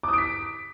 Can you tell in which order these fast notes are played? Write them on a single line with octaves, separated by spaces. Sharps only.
D6 D#6 D7 B6